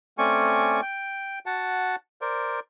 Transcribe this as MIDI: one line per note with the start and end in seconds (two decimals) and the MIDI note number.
0.18 0.81 57
0.18 0.81 60
0.18 0.81 61
0.18 0.81 74
0.18 0.81 80
0.18 0.81 85
0.82 1.39 79
1.46 1.96 66
1.46 1.96 78
1.46 1.96 81
2.21 2.60 70
2.21 2.60 72
2.21 2.60 74